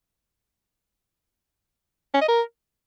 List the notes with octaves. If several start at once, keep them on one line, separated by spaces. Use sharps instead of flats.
C#4
D#5
A#4